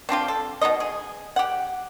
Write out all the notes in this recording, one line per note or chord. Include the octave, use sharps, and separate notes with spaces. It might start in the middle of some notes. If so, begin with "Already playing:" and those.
C4 D4 F4 G4
A4
B2 C#4 D#4 D#5
G#4
G4 F#5